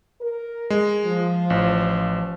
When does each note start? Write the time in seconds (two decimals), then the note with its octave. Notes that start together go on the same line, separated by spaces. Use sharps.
0.21 A#4
0.70 G#3
1.05 F3
1.50 A1